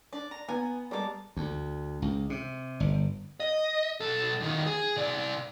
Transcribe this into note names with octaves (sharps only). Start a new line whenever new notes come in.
D4 D5
A#5
B3 G#5 A#5
G3 G#3 A#3 A4 D6
D2
C#2
C3
G1
D#5
B1 A4
E2 D#3
G#4
C3 D5